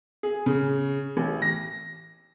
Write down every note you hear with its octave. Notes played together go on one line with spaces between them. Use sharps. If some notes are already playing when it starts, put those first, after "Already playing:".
G#4
C#3
A1
A#6